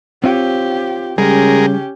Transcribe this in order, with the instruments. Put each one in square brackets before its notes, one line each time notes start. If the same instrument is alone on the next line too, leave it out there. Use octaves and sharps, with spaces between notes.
[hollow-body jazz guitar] C4 F4 C#5 [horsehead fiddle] G4
[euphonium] C#3 [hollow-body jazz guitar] G3 [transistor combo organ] G#3 G#4 A#4 [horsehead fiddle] C#4 G4